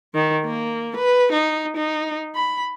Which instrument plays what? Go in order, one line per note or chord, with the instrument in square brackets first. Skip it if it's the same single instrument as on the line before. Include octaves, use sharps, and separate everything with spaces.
[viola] D#3
A#3
B4
D#4
D#4
B5